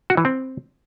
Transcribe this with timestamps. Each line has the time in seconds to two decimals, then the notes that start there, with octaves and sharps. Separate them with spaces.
0.10 F#4
0.17 E3
0.25 C4